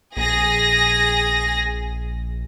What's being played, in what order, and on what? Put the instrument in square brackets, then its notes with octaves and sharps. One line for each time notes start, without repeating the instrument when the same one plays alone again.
[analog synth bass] A#1 [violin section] G#4 A#6